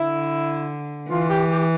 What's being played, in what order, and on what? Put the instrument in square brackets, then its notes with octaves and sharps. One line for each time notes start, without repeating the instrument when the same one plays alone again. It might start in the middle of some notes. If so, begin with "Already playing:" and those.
Already playing: [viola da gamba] D3 [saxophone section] E4
[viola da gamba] E3 [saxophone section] F4
[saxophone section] G4
G4